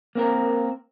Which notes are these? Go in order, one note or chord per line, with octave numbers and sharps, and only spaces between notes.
A#3 C4 A#4